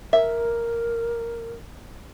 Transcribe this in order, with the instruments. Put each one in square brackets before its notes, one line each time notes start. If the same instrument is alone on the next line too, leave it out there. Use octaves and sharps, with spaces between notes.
[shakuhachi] A#4 [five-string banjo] E5